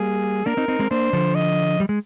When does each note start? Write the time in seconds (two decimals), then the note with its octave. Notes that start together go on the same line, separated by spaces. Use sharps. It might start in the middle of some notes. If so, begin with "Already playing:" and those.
Already playing: G3 A#3 G#4
0.46 A#3 D4 A#4
0.57 C4 D#4
0.68 C4 D#4
0.79 G#3 C4
0.91 A#3 D4 C5
1.13 D3 F3
1.35 D#5
1.80 G3
1.89 G#3